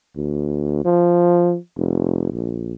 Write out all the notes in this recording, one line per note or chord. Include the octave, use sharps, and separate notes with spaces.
D2
F3
F1
A#1